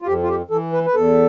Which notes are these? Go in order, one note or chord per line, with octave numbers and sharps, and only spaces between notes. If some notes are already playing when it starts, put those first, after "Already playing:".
F4
F2 G4
F4
G4
E3 A4
B4
B4
E2 A4